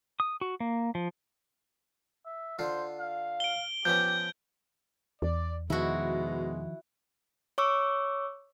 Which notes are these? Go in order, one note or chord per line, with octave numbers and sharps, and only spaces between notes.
D#6
F#4
A#3
F3
E5
D3 F4 C5
F5
D7 G7
F3 B3 C#4 G4 G6
E2 D5
B2 D#3 F3 G#3 E4 F#4
C#5 C#6 D6 E6